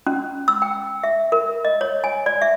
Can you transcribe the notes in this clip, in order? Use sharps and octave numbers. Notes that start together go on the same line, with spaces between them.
C#4
E6
G5
E5
A#4
D#5
C#5
G#5
D5
E5